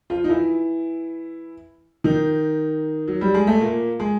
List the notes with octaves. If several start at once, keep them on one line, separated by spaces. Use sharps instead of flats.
F3 F4
D#4
E3 E4
D#3 D#4
F#3
G3
G#3
A3
A#2 A#3
G#3